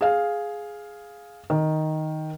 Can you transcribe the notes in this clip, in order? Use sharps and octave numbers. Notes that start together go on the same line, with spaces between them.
G#4 F5
D#3